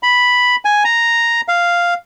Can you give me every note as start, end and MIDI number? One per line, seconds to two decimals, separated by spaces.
0.03 0.56 83
0.65 0.83 80
0.84 1.41 82
1.48 1.94 77